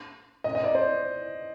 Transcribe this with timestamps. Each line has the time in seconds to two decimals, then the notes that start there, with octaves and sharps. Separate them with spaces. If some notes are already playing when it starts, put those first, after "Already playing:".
0.44 D#5
0.55 D#5
0.64 D5
0.75 C5